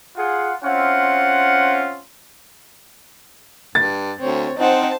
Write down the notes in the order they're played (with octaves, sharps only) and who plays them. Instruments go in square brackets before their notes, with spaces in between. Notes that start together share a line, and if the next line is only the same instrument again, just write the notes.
[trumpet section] F4 G#4 F#5
C4 C#4 E4 F4 F#5
[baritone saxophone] G2 [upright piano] A6
[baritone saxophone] D2 [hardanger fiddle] C4 C#5
[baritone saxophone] C4 [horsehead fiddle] D#4 F#5 [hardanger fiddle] C5 A5